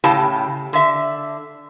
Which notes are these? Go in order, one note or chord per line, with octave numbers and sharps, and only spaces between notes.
A2 C#3 G4 A5
D3 E5